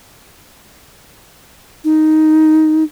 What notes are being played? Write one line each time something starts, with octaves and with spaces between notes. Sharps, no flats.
D#4